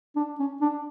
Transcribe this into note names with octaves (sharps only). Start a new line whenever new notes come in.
D4
C#4
D4